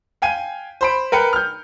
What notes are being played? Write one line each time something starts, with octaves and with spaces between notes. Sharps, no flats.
F5 G5 G#5 D#7
C5 B5 D7
A#4 B4 G5 C#7
F6 G6